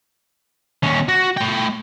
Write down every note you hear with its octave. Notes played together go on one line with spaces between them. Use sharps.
D#2 C#4
F#4
A3 G5